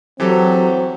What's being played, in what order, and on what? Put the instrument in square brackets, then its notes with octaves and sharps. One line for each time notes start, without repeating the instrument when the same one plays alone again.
[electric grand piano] E3 G4 A4 [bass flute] F#3 [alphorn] C4